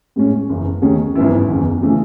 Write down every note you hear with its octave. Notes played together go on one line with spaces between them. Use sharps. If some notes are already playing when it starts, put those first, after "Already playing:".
A2 G#3 C#4
F#1 F#2 E3
D#2 D#3 A3 C#4 G#4
G#1 F#2 E3 B3 E4
F#1 E2 D#3
C#3 E3 A3